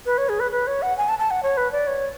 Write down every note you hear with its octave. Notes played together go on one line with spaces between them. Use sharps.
B4
C#5
G#4
B4
B4
C#5
F#5
G#5
A5
A5
F#5
C#5
B4
D5
C#5